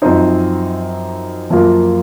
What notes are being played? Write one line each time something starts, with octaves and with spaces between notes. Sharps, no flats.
F#2 F3 C4 D#4
F#2 F3 A#3 F4